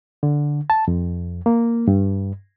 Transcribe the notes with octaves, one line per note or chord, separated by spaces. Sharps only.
D3
A5
F2
A#3
G2